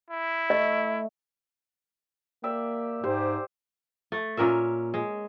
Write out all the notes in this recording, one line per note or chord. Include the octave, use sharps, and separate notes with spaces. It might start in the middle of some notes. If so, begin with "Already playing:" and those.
E4
A3 D#5
A#3 G4 D5 E5
G#2 G4 C5
A3
A#2 C#4 A#4 E5
G#3